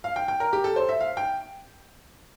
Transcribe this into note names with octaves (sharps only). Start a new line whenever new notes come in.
F5
G5
G5
A#4
G4
A4
C5
E5
F5
G5